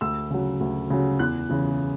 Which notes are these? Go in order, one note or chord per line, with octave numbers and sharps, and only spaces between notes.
D2 E6
C#3 F#3
D2
C#3 F#3
E2 F#6
C#3 E3